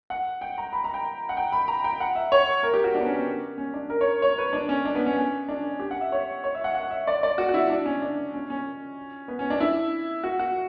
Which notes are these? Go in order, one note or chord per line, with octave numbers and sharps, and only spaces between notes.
F#5
G5
A#5
B5
A#5
G5
F#5
G5
B5
A#5
G5
F#5
E5
C#5
A#4
G4
F#4
D4
B3
C#4
C#4
C#4
D4
A#4
C#5
C#5
B4
D4
C#4
D4
B3
C#4
C#4
D4
G4
F#5
E5
C#5
C#5
E5
F#5
F#5
E5
D5
D5
F#4
F#4
E4
D4
C#4
D4
C#4
C#4
B3
C#4
D4
E4
F#4
F#4